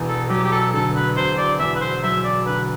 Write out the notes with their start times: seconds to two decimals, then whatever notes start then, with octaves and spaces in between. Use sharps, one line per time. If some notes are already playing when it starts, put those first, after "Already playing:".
Already playing: E1 E2
0.08 A4
0.29 F#3 G4
0.44 G4
0.52 A4
0.73 D3 A4
0.94 B4
1.16 E1 C5
1.38 D5
1.59 E2 E5
1.75 B4
1.81 C5
2.03 F#3 E5
2.24 D5
2.46 D3 B4